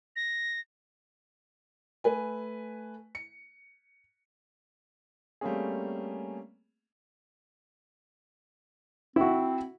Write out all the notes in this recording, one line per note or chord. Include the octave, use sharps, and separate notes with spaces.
A#6
A3 B4 G#5
C#7
G3 A3 A#3 C4 C#4 G#4
C4 E4 F#4